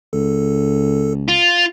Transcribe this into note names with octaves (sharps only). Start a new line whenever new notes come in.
C#2 A4
F4